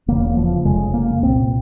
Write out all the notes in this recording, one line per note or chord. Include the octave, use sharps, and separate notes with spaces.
E1 E2 C#3 A#3
F3
F1 F2 C#3 G#3
A#3
C2 A#2 C4